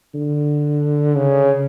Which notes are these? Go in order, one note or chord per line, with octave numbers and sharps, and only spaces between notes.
D3
C#3